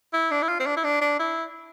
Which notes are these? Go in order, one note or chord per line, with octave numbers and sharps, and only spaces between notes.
E4
D4
E4
F4
C4
D4
E4
D4
D4
E4